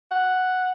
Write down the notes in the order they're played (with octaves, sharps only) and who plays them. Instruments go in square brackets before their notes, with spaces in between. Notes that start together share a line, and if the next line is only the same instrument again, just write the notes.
[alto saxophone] F#5